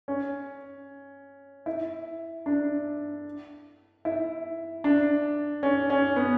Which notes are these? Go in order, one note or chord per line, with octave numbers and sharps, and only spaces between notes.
C#4
E4
D4
E4
D4
C#4
C#4
B3